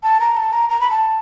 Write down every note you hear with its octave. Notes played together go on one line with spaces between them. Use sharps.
A5
A#5
A5
A#5
A#5
B5
A5